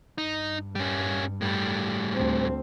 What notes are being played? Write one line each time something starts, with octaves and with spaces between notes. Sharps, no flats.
G2 D#4
G3 C#4
A2 G3
D2 C4